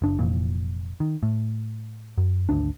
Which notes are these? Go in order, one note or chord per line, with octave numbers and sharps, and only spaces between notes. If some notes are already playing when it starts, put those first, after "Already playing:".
F#1 D4
F1 F2 A#2 E3
D#3
A2
F#2
G#1 D2 D4